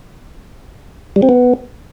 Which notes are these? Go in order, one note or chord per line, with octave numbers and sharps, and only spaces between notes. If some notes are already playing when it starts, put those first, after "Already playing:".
G3
C4
B3